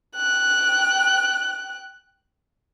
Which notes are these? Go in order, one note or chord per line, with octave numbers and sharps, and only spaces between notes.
G5 F#6